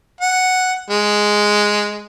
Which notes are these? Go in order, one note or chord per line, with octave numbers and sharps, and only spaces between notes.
F#5
G#3